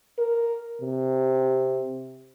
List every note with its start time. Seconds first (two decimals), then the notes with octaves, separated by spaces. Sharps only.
0.18 A#4
0.81 C3